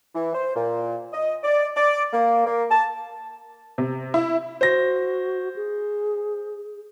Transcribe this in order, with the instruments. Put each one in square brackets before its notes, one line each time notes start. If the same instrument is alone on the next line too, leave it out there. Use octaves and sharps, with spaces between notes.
[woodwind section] E3
C5
A#2
D#5
D5
D5
A#3
A#3
A5
[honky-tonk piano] C3
E4
[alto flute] F#4 [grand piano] C5 A#6
[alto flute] G#4